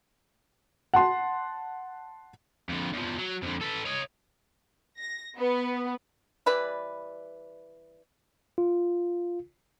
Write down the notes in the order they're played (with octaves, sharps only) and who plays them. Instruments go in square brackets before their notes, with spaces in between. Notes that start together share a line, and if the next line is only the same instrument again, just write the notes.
[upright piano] F#5 A5 C6
[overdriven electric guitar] F2 D3
E2 F3
F#3
F2 D3
A4 B4
C#5 D#5
[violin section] A#6
B3
[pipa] E3 G3 B4 D5
[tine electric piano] F4